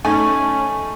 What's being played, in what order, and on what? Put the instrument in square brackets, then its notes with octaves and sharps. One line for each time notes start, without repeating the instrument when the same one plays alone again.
[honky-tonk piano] A3 D#4 [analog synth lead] C#4 [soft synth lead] G#5 [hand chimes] C#6